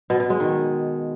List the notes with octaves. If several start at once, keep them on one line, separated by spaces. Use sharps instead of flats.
B2
B2
G#3
D#3